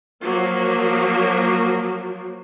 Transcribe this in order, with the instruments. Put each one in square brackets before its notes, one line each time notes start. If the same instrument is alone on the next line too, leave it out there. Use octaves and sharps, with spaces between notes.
[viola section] F3 F#3 A#3